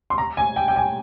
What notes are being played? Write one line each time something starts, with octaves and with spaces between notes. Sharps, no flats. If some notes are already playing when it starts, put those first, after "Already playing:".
C6
A#5
G#5
G5
G5
G#5